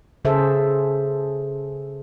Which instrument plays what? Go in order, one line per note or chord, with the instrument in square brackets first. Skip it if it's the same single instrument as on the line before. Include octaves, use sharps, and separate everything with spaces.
[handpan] C#3 G#4 A4 C5 E5